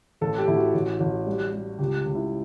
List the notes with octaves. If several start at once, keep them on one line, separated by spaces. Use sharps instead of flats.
A1 A4
G4
A1 E4
F#4
A1
A1
G3
G3
C#2 G4
C#2
E4